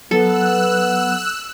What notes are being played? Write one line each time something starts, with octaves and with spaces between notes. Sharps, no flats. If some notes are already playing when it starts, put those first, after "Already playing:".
F#3 B3 A4 E6 F#6